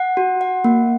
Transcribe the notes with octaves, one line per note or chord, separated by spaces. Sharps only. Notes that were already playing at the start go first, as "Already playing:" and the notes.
Already playing: F#5
F#4
F#5
A#3